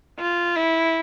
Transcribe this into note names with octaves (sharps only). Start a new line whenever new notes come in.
F4
E4